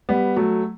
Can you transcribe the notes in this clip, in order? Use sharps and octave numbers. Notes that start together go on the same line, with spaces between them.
G3 B3
F#3 A3